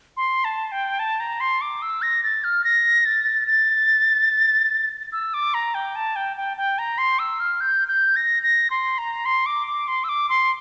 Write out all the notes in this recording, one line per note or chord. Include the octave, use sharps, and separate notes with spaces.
C6
A5
G5
A5
A#5
C6
D6
E6
A#6
A6
F6
A#6
A6
A6
E6
D6
A#5
G5
A5
G5
G5
G5
A#5
C6
E6
F6
G6
G6
A#6
A#6
C6
A#5
C6
D6
D6
C6
E6
D6
C6